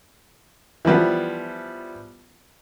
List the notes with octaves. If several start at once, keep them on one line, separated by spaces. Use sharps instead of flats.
E3 F3 G3 B3